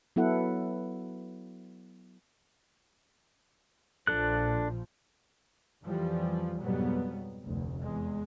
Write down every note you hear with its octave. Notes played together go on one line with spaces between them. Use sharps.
F#3 B3 E4 A4 F#5
A#1 A#2 F3 D4 A4 F#6
F2 E3 F3 G3
F2 G#2 B2 F#3 G3 B3
F1 D2
E2 G#3